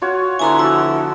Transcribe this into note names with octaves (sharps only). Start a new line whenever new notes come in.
F4 F#4 C#5
D3 B3 E4 G#5 A#5 C6
F3 F#4 E6